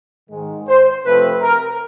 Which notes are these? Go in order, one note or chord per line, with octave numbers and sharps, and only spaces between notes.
G#2 D#3 G#3
C5
C3 F3 A3 C4 B4
A#4